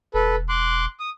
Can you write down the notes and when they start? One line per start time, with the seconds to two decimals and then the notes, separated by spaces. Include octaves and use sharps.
0.14 E1 A4 B4
0.49 C6 D6 F#6
1.00 D#6